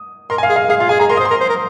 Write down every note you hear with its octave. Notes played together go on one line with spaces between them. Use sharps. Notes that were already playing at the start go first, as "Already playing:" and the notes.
Already playing: D#6
A#4 C6
G#5
F5
G#4
F5
G#4 F5
F4 F5
G#4 G#5
G#4 A#5
A#4 C6
C5 D#6
C6
A#4
C5
A#4